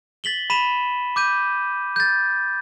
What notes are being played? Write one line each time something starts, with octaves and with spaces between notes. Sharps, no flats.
A6 B6 F#7 G7
B5 B6 D#7 E7 G7
D6 G6 D#7
G6 A6